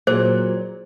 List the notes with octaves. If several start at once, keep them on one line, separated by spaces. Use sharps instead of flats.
A#2 F#3 G#4 C5